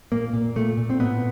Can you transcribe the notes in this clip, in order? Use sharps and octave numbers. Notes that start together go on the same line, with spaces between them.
A#2 A#3
A#2
A#2 A3
A#2
C4
A2 B3